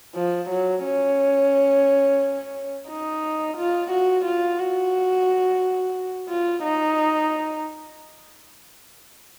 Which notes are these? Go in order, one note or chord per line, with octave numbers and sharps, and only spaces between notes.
F3
F#3
C#4
D#4
F4
F#4
F4
F#4
F4
D#4